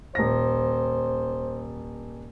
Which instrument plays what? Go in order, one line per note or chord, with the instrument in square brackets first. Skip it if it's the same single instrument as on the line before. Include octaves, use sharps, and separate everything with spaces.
[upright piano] D#1 A#6 [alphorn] C5